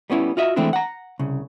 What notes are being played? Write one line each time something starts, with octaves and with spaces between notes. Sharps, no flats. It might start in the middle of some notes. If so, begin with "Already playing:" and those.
G3 B3 C#4 E4
F4 F#4 D#5 E5
E3 G#3 A3 C4 D4 E4
F#5 A#5
C2 C#3